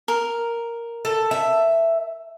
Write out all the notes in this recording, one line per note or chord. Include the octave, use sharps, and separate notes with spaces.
A#4
A4
E5